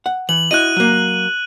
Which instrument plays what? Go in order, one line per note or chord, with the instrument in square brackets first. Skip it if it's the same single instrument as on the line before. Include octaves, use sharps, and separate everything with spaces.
[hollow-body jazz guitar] F#5
[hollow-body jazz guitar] E3 [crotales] F#7
[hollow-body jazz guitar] E4 F#4 D#5 [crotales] F#6 D#7
[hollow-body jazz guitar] F#3 A#3